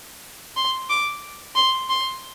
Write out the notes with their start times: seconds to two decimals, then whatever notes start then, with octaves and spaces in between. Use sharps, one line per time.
0.56 C6
0.89 D6
1.55 C6
1.89 C6